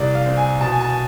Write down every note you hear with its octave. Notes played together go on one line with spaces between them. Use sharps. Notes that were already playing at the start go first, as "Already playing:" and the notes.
Already playing: C2 C3 D5
F5
C4
G#5
B2 A5
G#5
A5
G#5